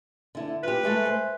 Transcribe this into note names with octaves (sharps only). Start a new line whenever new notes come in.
D3 E4
F4 G4 B4
G#3 A3 A4
C5 G#5